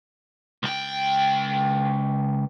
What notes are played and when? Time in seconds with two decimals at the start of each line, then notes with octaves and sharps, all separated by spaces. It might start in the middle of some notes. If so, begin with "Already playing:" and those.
0.63 C#2 G5